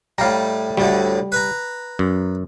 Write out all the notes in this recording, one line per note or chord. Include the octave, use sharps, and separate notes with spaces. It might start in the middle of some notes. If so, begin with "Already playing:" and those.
A2 G3 F5 A#5
D2 A2 D3 G3
B4 A#5
F#2